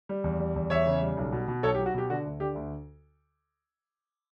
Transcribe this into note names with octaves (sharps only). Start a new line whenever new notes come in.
G3
E2
G3
E2
E2 C#5 E5
C#3
G3
B1
B2
B2
B1 A4 C#5
G4
F#3
F#4
B2 G4
D3 F#4
D2
D3 G4
D2